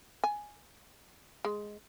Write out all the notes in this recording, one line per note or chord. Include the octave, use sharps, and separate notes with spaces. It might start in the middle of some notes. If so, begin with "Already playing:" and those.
G#5
G#3